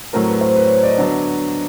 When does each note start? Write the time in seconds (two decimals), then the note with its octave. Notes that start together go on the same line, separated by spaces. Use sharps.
0.13 A2 F#3 A3 C4 A#4
0.27 B4
0.41 C5
0.56 B4
0.66 C#5
0.83 D5
0.87 D#5
0.98 D3 F#3 B3 D4